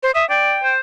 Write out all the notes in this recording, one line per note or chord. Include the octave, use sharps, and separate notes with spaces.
C5
E5 D#6
D5 G5
C5